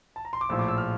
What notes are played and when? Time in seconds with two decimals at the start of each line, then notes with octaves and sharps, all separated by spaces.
0.16 A5
0.25 A#5
0.33 C6
0.41 D6
0.49 A#1 A2 F3 E6
0.59 D6
0.68 E6
0.78 F6